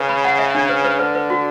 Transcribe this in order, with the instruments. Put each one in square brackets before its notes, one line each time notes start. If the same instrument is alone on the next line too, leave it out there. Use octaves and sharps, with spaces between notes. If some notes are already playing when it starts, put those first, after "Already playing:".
Already playing: [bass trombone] C#3 [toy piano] B4
[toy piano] B5
F#5
E5
D4
B4
B4
[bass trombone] D3 [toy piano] B4
[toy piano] B4
F#4